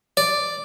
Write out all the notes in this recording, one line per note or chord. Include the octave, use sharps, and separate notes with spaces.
D5